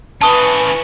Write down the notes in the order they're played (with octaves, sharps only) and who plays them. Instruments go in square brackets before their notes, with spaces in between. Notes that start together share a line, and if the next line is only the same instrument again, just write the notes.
[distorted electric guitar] E3 C#4 [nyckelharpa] B4 [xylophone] A5 D#6 G7